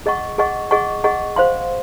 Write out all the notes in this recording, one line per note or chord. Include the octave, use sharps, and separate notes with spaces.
G#4 D#5 F#5 C#6
G#4 D#5 F#5 C#6
G#4 D#5 F#5 C#6
G#4 D#5 F#5 C#6
C5 F5 C6